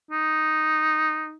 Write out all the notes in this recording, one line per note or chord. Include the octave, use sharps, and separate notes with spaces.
D#4